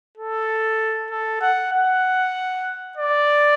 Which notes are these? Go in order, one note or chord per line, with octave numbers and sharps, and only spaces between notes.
A4
A4
F#5
F#5
D5